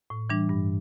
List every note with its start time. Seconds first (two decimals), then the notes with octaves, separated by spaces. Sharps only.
0.10 A2
0.30 E3 G3 D4
0.49 G2